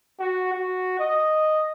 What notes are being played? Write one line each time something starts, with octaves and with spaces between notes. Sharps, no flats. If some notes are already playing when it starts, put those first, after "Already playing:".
F#4
F#4
D#5